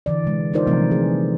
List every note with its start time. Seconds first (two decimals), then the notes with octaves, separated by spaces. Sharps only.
0.06 D3 E3 D5
0.24 C3 G#3
0.53 D4 D#4 F4 A#4 C5 D5
0.67 C3 E3 F3 G3 A3 C4
0.91 G#4